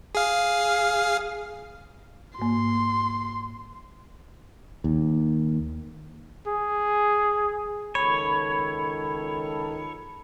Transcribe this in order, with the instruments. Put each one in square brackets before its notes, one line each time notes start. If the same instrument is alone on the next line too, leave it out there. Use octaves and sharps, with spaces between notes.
[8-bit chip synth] G#4 F5
[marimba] G#2 A#3 [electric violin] C6
[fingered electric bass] D#2
[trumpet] G#4
[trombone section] C#2 D#3 A4 [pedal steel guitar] C#5 [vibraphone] B5